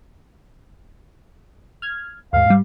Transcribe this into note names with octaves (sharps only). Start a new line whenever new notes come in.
F6 G#6
D#2 G#2 F5
G#2 G3